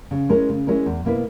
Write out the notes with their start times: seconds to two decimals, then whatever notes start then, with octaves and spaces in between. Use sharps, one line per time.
0.11 C#3
0.29 G#3 C#4 E4 A#4
0.49 C#3
0.67 G#3 C#4 E4 A#4
0.86 E2
1.04 B2 A#3 E4 B4